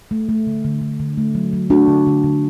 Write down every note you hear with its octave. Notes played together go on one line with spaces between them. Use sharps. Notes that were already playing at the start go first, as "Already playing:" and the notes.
A3
A3
D3
D3
D3
D3
A3
F#3
F#3
A3 D4 F#4
D3
D3
D3